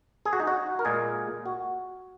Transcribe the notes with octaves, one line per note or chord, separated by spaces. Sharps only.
G#4
F#4
D#4
F#4
A#4
A#2 G#3 G#4
F#4